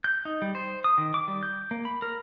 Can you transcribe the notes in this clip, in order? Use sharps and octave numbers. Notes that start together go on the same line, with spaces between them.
G6
D#4
G3
C5
D#6
D#3
D6
G3
G6
A#3
B5
A#4